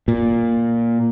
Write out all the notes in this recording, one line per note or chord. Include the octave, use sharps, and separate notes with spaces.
A#2